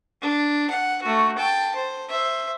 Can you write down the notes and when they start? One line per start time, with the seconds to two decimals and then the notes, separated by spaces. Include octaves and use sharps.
0.22 D4
0.70 F#5
1.03 A3 F#4
1.38 G5 A5
1.75 C5
2.09 C5 E5